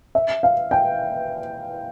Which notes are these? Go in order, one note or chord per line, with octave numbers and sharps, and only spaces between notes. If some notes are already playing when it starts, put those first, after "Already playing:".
E5
F5
G5